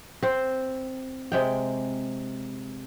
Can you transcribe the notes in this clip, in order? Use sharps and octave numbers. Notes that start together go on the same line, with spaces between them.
C4 C5
C3 G#3 G5